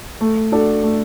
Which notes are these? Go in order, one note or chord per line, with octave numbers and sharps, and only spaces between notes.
A3
D4 F#4 A4
A3